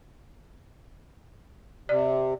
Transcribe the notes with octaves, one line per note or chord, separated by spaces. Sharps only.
C3 D5